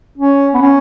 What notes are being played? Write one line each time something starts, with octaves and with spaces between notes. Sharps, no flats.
C#4
B3
C#4